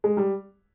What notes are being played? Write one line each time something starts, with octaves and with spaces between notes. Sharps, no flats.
G#3
G3